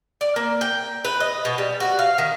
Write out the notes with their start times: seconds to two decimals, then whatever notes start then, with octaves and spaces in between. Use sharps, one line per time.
0.21 D5
0.36 A#3
0.61 G5
1.05 B4
1.20 D#5
1.45 B2
1.58 G3
1.80 F#4
1.99 F5
2.18 D#3